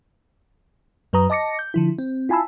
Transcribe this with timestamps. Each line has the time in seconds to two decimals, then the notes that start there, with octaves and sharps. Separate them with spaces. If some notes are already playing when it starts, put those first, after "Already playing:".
1.13 F#2 F#3 B4 A#5 D#6
1.30 D#5 A5 D6 A#6 C#7
1.59 G6
1.74 D3 F3 E4
1.99 C4
2.29 E4 F4 G#5 A5 B5 E6